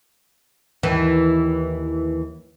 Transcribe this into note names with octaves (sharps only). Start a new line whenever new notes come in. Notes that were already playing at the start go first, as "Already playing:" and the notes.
D#2 E3